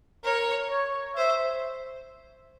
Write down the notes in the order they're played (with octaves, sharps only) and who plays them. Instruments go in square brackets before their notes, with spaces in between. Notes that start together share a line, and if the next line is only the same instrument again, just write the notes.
[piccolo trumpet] A#4 [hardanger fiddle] C#5
[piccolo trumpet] C#5
[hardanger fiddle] C5 [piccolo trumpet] E5